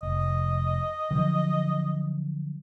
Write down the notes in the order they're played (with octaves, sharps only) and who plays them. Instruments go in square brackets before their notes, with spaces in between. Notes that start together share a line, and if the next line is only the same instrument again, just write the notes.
[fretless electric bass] F1 [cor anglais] D#5
[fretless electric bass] D3 F3 F#3